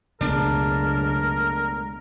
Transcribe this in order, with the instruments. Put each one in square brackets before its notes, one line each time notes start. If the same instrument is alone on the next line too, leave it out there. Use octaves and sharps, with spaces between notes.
[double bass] C#2 F#2 [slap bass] B2 G#3 A3 [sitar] D4 [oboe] A#4